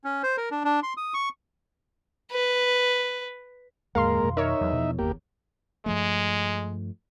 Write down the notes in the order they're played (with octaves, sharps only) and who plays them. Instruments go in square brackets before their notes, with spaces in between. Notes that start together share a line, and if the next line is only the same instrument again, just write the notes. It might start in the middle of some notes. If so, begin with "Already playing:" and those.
[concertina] C#4
C5
A#4
D4
D4
C6
D#6
C#6
[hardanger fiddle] B4
[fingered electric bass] D#2 G#2 D3 [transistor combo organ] G#3 A#3 A#4 [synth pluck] F5 C6
[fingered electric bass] F2 B2 D#3
[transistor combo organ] D#4 E5 [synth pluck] A#4 C#5
[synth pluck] E2 [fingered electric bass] F#3
[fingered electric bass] B2 D3 F3
[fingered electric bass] F#1 D#2 [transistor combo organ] A#3 G4
[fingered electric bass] G2 F3 A3 [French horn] G#3